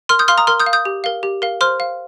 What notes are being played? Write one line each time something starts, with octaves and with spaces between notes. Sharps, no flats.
A#4 C6 F6
D#6 G6
F5 C6 F6
A#5 D#6
A#4 C6 F6
D#6 G6
F5
D#6 G6
G4
A#4 F5
G4
A#4 F5
C5 C6 F6
F5